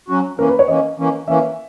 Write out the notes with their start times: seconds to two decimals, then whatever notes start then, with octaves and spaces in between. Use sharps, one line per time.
0.08 F#3 C#4 F#4
0.39 E3 A#3 C#4 A#4
0.49 B4
0.59 C#5
0.68 E3 A#3 C#4 D#5
0.98 E3 A#3 C#4
1.28 E3 A#3 C#4 E5